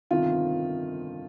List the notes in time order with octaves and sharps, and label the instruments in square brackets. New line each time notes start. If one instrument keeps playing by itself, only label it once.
[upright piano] G1 F2 C3 D#3 F4